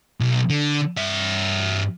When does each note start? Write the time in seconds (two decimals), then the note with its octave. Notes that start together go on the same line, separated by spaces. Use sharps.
0.20 B1
0.50 D3
0.97 G2 E5